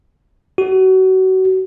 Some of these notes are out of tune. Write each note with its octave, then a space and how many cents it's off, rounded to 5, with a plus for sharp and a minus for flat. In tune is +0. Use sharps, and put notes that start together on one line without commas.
F#4 +30